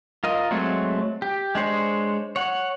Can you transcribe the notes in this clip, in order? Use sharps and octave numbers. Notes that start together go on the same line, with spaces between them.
F4 A#4 D#5
F#3 G#3 A3 C4 C#5
G4
G#3 D4 C5 C#5
C#5 F#5